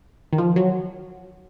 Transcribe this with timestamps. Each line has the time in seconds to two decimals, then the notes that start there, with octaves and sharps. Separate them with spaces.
0.33 D#3
0.38 F3
0.56 F#3